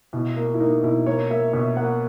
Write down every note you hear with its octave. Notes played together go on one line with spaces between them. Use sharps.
B2 E4
A#3
E4
A#3 D#4
B2 E4
A#3 C#5
A#3 E5
B2 E5
A#3 F#5